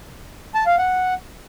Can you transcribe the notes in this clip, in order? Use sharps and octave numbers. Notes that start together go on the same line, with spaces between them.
A5
F5
F#5